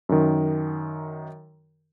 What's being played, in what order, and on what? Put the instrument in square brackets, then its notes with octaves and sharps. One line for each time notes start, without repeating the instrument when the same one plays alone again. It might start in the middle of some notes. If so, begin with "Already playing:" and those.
[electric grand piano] F#2 D#3